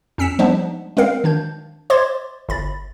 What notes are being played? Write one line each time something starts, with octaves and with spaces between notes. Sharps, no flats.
F2 C#4 E6 B6 C#7 E7
F3 G3 G#3 B3 D4 D#4
G#3 C4 A#4 F5
D#3 D4 G6
C5 D#5 C6 D6 G#6 A6
G1 B5 A6